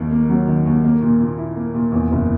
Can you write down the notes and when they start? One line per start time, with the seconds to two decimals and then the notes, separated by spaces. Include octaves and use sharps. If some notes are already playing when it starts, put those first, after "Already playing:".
Already playing: D#2 D#3
0.11 A#3
0.29 F#3
0.47 D#3
0.66 D#2
0.84 A#3
1.02 A#2
1.20 A#2
1.37 E4
1.56 A#3
1.74 A#2
1.92 E2
2.11 F#1